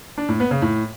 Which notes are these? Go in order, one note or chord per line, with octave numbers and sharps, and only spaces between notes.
D4
A2
B3
C#3
A2